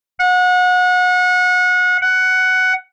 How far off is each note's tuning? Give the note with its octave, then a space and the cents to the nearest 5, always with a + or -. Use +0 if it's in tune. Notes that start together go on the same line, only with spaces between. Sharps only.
F#5 -30
F#5 +10